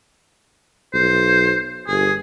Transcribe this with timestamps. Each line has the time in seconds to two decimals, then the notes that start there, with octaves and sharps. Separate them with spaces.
0.94 B1 C5
1.87 G1 G#4